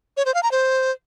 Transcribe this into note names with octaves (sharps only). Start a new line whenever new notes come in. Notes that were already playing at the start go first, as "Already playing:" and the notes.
C#5
C5
F5
A#5
C5